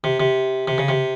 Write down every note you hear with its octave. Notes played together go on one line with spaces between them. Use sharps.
C3
C3
C3
C#3
C3